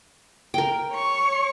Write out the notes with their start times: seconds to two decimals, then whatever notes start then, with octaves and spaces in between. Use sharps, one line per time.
0.54 A#4 G5
0.92 C#5 C#6